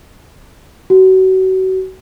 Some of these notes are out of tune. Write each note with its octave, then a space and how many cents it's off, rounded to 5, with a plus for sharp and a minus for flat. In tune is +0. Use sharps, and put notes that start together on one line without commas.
F#4 +30